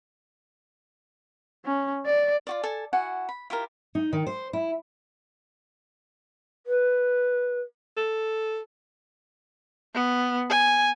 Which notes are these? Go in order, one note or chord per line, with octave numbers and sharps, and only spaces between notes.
C#4
D5
F4 F#4 D5
A4 G#5 A5
E4 F#4 F#5 G#5
B5
E4 F4 G4 A#4
D#4
D#3
C5
E4
B4
A4
B3
G#5